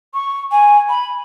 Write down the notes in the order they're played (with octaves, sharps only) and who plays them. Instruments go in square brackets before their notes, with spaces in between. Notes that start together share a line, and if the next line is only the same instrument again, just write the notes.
[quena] C#6
G#5
B5